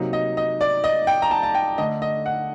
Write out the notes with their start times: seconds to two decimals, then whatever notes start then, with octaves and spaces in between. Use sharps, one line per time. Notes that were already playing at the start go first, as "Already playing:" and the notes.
Already playing: C3 F#3 A#3 D#4
0.13 D#5
0.37 D#5
0.61 D5
0.84 D#5
1.07 G5
1.22 A#5
1.31 A5
1.43 A5
1.55 G5
1.78 D3 A3 D4 D#5
2.02 D#5
2.26 F#5